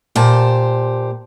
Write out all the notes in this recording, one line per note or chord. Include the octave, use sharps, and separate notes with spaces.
A#2 G4 C5 A5